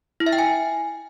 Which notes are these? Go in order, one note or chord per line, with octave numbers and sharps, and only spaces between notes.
E4
E5
G5
G#5